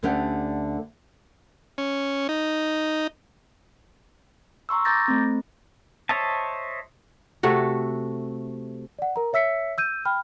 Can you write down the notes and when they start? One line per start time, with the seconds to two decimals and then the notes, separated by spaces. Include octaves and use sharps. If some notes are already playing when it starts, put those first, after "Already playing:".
0.03 D2 D3 A3 C#4 G4 F#5
1.78 C#4
2.29 D#4
4.69 A#5 C6 C#6 E6
4.85 A#5 D6 G6 A6 A#6
5.08 A3 C4
6.09 C5 C#5 D#5 E5 A5
7.43 C3 A3 F#4
8.99 D5 F#5
9.16 A#4 A#5
9.33 C#5 E5 E6 B6 C#7
9.78 E6 G6 D#7
10.05 G5 B5 F6